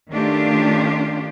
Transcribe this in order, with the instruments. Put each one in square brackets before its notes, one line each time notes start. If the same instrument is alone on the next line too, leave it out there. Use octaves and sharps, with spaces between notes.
[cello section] D#3 A3 C#4 D4 F4 G4